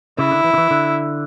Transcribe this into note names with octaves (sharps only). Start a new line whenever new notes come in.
C#3 E4
D3
E3
D3
E3
D3